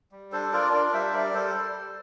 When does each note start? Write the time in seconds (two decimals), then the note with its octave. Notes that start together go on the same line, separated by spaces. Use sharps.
0.12 G3
0.32 D4 A4 C5
0.53 F4 A#4 D5
0.73 D4 A#4 D5
0.93 G3 C5 E5
1.14 G3 A#4 D5
1.34 G3 A4 C5
1.54 G3
1.75 G3